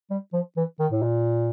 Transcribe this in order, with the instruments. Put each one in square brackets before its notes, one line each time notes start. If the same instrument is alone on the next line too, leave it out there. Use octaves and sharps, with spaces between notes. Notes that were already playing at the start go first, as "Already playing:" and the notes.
[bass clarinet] G3
F3
E3
D#3
A2
A#2